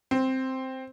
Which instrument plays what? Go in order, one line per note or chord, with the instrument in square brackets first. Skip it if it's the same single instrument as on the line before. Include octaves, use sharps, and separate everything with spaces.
[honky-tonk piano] C4